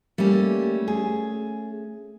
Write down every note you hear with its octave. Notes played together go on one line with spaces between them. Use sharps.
G3 A3 A#3 C#4
G#4